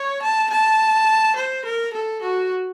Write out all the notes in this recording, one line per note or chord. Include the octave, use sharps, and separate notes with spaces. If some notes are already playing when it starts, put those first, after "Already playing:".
Already playing: C#5
A5
A5
C5
A#4
A4
F#4